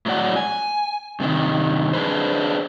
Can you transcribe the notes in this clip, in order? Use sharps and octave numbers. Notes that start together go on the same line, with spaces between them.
A2 F#3 G#3 D5 F#5
G#5
G2 C3 D#3
D4 G#4 B4 C5